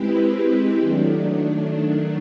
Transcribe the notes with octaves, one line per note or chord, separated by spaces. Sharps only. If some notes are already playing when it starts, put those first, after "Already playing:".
Already playing: G#3 C4 E4 G4 B4
D#3 F#3 A3 D4